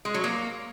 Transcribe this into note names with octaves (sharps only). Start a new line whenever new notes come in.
G#3
F#3
A#3